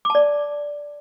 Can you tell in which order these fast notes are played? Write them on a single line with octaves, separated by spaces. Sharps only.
D6 A5 D5